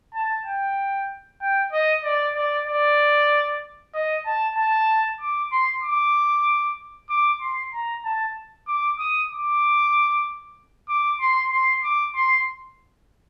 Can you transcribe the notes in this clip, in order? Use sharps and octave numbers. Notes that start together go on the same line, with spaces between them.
A5
G5
G5
D#5
D5
D5
D5
D#5
A5
A5
D6
C6
D6
D6
C6
A#5
A5
D6
D#6
D6
D6
C6
C6
D6
C6